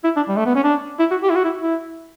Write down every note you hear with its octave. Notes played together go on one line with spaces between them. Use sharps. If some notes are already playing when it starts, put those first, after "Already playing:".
E4
D4
G3
A3
B3
C#4
D4
E4
F#4
G4
E4
F#4
E4
E4